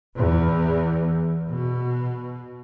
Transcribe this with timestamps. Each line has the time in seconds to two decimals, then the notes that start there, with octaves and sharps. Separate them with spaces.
0.16 E2
1.48 B2